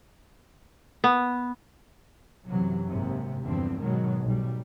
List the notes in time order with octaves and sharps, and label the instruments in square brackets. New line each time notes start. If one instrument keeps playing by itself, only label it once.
[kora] B3
[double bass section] F#2 C3 E3 F#3
G#1 D#2 G#2 C3
E2 G2 D3 F3 C4
G#2 B2 D#3 F#3 G#3
B1 G3